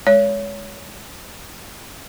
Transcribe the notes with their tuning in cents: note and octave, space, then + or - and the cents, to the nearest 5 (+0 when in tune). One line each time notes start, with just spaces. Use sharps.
G#3 +0 C#5 +25